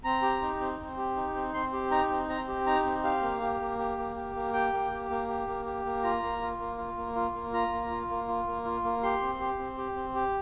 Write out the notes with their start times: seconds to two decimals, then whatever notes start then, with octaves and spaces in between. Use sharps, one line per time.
0.04 C4 A#5
0.22 G4
0.42 D#4
0.60 C4
0.79 C4
0.97 G4
1.16 D#4
1.35 C4
1.54 C4 C6
1.73 G4
1.91 D#4 A#5
2.10 C4
2.29 C4 A#5
2.48 G4
2.66 D#4 A#5
2.86 C4
3.04 G4 F5
3.22 A#3
3.42 G4
3.60 A#3
3.79 G4
3.98 A#3
4.16 G4
4.35 A#3
4.53 G4 G5
4.73 A#3
4.92 G4
5.10 A#3
5.28 G4
5.47 A#3
5.66 G4
5.85 A#3
6.03 F4 A#5
6.23 A#3
6.41 F4
6.59 A#3
6.78 F4
6.97 A#3
7.15 F4
7.34 A#3
7.53 F4 A#5
7.72 A#3
7.90 F4
8.10 A#3
8.28 F4
8.47 A#3
8.65 F4
8.84 A#3
9.03 G4 C6
9.22 C4
9.40 G4
9.59 C4
9.77 G4
9.96 C4
10.15 G4